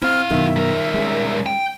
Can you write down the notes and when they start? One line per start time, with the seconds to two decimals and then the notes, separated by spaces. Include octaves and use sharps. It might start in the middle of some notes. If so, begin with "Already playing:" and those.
0.03 C4 E4 F5 F6
0.31 F#2 B2 D#3 E5
0.56 G3 A#4
0.94 G#3 C#4
1.46 G5